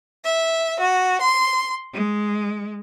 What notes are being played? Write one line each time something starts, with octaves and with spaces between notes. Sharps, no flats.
E5
F#4
C6
G#3